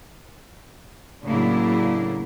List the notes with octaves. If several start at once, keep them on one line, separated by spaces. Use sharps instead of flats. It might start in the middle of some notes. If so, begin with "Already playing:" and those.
A2 C#3 F#3 A#3 D4 E4